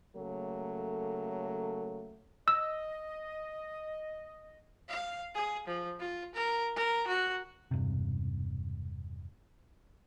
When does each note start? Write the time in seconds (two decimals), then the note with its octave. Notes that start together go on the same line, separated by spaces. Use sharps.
0.16 C#3 F#3 A3 A#3 A4
2.48 D#5 E6
4.89 F5
5.35 G#4
5.67 F3
5.99 F4
6.35 A#4
6.76 A#4
7.07 F#4
7.71 E1 G2 C3